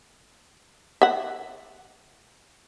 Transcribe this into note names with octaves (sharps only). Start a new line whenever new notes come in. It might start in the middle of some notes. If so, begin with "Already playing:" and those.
E5 F#5